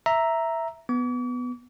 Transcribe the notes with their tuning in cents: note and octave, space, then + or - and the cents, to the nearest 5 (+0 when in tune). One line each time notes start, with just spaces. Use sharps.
E5 +0 A#5 +0
B3 +5 D6 -45